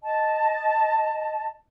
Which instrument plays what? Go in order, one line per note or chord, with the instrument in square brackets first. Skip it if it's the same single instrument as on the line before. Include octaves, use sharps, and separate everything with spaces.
[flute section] D#5 A5